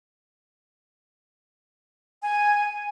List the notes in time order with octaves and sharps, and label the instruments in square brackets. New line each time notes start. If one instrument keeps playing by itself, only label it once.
[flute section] G#5